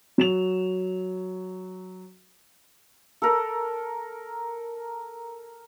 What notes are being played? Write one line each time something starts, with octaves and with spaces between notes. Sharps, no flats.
F#3 E7 F7
A4 A#4